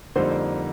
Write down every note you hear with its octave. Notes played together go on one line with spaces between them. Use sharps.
F2 D3 G3 A#3 D#4 C5